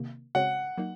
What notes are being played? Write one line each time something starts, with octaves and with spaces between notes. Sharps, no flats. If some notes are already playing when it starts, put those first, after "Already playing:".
Already playing: C3 D#3 A#3
C#3 G#3 C4 F#4 C#5 F#5
F#3 A#3 D#4